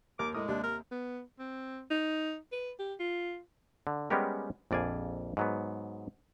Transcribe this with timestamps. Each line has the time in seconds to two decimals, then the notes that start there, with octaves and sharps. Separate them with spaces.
0.19 D#2 A#4 D6
0.34 A2 G#3 A#4 D6 D#6
0.48 D#2 C3 D4
0.63 A#4
0.91 B3
1.39 C4
1.90 D#4
2.52 B4
2.79 G4
3.00 F4
3.87 D3
4.10 G3 G#3 B3 C#4 G4 A#4
4.71 A#1 F2 D5 F5 G#5
5.37 G#2 F#3 B3